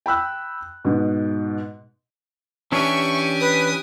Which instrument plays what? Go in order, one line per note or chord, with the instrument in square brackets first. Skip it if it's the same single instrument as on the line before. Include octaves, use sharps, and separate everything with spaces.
[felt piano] G5 B5 E6 F#6
G#2 B2
[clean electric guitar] E3 C#4 D4 [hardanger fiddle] G4 G#5 [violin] E5 C#6
[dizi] B4 [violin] D#6